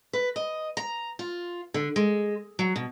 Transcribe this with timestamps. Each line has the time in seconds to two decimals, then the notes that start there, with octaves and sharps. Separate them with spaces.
0.13 B4
0.36 D#5
0.77 A#5
1.19 F4
1.74 D3
1.96 G#3
2.59 F#3
2.76 B2